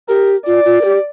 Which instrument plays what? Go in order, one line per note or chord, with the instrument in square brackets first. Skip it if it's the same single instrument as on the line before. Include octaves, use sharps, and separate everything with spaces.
[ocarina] G4 [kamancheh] A#4
[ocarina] F4 [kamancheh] D5
[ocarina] F4
A#4
G4